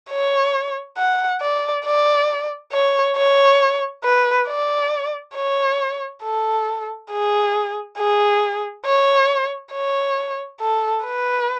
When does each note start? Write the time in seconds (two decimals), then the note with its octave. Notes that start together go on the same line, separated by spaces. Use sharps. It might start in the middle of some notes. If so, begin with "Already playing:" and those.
0.10 C#5
0.98 F#5
1.41 D5
1.85 D5
2.73 C#5
3.17 C#5
4.04 B4
4.48 D5
5.36 C#5
6.23 A4
7.11 G#4
7.98 G#4
8.85 C#5
9.73 C#5
10.61 A4
11.04 B4